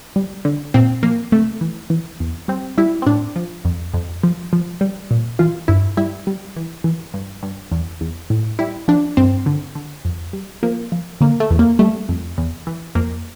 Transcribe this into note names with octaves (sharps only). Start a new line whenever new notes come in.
G3
D3
A#2 C4
F3 A#3
C3 A3
E3
E3
E2
G3 C4
G3 E4
C4
A2 D4
F3
F2
F2
F3
F3
G3
A#2
E3 F4
G2 E4
G3 E4
G3
E3
E3
G2
G2
E2
E2
A2
G3 E4
F3 D4
G2 C4
D3
D3
F2
G3
F3 A#3
F3
D3 A#3
A3
E2
A#3
G3 A3
F2
E2
E3
F2 A#3